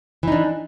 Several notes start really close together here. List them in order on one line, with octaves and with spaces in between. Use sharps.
E3 D#4 D4